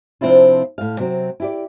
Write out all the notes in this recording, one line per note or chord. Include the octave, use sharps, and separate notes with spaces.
C3 F3 C4 D4 E4 F4
A2 F5
C3 F#3 C4
E4 G4 D5